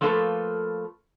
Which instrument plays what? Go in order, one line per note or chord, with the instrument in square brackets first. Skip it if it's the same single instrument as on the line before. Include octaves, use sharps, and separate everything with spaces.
[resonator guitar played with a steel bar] F3 A3 A#3 F4 A4 B4